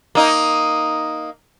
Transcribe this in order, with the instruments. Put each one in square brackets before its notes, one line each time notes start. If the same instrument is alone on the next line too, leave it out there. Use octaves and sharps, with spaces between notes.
[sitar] A#3 D#4